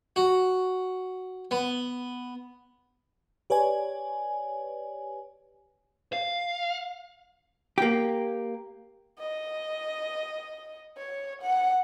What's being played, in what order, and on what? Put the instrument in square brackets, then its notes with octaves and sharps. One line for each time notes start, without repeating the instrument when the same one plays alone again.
[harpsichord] F#4
B3
[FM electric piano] G4 B4 C#5 D5 G#5
[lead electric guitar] F5
[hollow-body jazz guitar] A#3 G4
[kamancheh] D#5
C#5
F#5